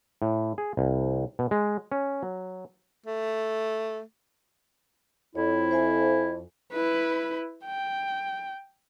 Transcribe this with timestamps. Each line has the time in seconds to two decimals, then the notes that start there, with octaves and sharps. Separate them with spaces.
0.22 A2
0.58 G#4
0.77 C2
1.39 B2
1.51 G#3
1.92 C#4
2.23 F#3
3.06 A3
5.35 F2 E4 C#5
5.71 C5 E5 G#5
6.73 E4 B4
7.66 G5